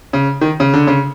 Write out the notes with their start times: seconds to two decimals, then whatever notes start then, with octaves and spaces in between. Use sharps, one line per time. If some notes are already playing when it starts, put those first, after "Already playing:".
0.13 C#3
0.41 D#3
0.60 C#3
0.74 D3
0.87 C#3